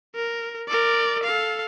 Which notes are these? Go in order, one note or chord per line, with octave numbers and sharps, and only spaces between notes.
A#4
A#4 D5
A4 F5